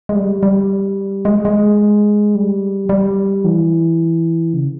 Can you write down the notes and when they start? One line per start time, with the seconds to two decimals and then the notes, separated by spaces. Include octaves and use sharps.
0.09 G#3
0.15 G3
0.43 G3
1.25 G#3
1.45 G#3
2.35 G3
2.89 G3
3.44 E3
4.54 C#3